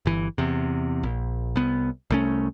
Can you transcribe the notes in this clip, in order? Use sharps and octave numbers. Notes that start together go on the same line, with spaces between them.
G1 E3
E2 C3
A#1
C2 B3
C2 A3 C#4